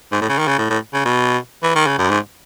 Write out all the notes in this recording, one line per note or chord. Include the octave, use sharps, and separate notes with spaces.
G#2
A2
C#3
D#3
C#3
A2
A2
C#3
B2
E3
D#3
C#3
F#2
G#2